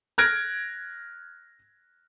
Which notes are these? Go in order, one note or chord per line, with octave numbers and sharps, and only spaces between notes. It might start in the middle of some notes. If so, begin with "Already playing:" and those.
F6 F#6 G#6 A#6 D7